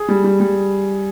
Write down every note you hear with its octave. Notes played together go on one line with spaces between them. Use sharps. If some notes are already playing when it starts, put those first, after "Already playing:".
Already playing: G#4
G3
G3
G3